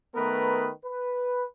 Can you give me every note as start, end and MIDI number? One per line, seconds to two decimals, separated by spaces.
0.15 0.70 51
0.15 0.70 57
0.15 0.70 59
0.15 0.70 70
0.15 0.70 71
0.84 1.46 71